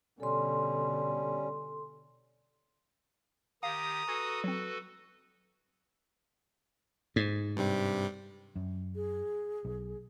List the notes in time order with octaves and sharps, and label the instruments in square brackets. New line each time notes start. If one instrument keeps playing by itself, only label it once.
[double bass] B2 D3 [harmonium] G3 C#4 [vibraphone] A4 C6
[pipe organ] D#3 G4 [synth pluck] F5 [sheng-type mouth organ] A#5 D#6
[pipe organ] F#4 A4 B4 [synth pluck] G#5 G#6 C7
[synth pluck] F#3 C4
[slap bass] G#2
[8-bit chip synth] G2 C3 G3
[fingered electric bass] F#2
[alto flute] G#4
[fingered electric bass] B1